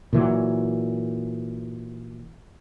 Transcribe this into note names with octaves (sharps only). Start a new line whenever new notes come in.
A#2 E3 F#3